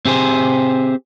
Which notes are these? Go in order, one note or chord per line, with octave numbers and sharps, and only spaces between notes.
C4 G4 G#4 C5